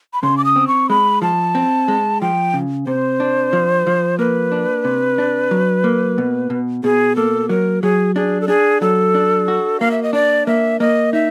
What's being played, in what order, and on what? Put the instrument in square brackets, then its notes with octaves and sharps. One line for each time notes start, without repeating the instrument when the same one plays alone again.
[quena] B5
[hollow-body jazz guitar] C#3 [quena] C6
[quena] D6
D#6
[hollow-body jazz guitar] C4
[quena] C#6
[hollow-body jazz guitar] G#3 [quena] B5
[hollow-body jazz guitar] F3 [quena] A5
[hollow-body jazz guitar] C4
G#3
[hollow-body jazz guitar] F3 [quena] G5
[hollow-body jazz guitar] C#3
[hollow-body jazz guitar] C3 [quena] C5
[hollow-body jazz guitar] D4
F3
F3
[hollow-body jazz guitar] A#3 [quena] B4
[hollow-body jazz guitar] D4
C3
D4
F#3
A#3
B2
B2
[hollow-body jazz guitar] B2 [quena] G#4
[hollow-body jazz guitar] A#3 [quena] A4
[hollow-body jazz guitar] F#3 [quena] A#4
[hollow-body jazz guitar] F#3 [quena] G#4
[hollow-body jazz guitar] D4 [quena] G#4
[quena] A4
[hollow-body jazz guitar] D4 [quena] G#4
[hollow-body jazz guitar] F#3 [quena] A4
[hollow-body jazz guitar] D4
F#4
[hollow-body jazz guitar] A#3 [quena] F5
[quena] E5
D#5
[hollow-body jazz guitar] D4 [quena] D5
[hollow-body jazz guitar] A#3 [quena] E5
[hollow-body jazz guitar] A#3 [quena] D#5
[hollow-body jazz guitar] D#4 [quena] E5